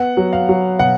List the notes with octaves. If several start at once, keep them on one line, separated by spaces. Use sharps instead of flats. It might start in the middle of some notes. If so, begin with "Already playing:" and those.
Already playing: B3 F#5
F#3
F5
F#3
B2 F#5